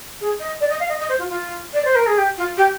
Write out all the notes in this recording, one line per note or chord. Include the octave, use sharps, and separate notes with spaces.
G#4
D#5
D5
D#5
F5
D#5
D#5
C5
F4
F4
D5
C5
A#4
G#4
G4
F4
G4